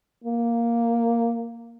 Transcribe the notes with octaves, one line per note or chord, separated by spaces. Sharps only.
A#3